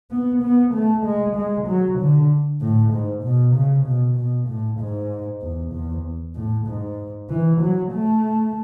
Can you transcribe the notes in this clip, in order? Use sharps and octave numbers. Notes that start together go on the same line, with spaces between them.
B3
B3
A3
G#3
G#3
F#3
D3
A2
G#2
B2
C#3
B2
B2
A2
G#2
E2
E2
A2
G#2
E3
F#3
A3